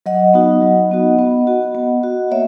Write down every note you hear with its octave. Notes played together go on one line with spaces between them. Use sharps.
F#3 D#5 F#5
B3 D#4 F#4
F#3
B3 D#4 F#4
B3
F#4
B3
F#4
A#3 C#5 E5